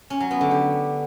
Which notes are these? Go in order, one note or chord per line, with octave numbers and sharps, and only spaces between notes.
C#4
F#3
B3
D3
G4